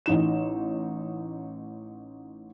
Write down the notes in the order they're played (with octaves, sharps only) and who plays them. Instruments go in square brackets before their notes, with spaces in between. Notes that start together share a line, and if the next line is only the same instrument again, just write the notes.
[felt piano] A1 D#4 E7